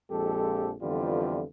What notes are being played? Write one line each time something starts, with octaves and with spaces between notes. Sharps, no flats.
A#1 F2 G#3 G4 A4
F2 D3 E3 G3 B3 F4